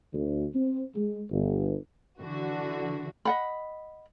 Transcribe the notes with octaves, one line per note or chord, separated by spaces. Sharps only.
D2
C4
G#3
G1
D3 E3 F#4
D#5 F#5 B5